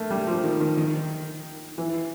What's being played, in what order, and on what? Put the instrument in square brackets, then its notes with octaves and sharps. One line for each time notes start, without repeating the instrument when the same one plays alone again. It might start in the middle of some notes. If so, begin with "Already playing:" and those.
Already playing: [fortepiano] A3 A#3
G3
F3
D#3
D#3
D#3
E3